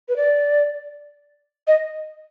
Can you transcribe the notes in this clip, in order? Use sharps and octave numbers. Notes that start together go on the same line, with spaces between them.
B4
D5
D#5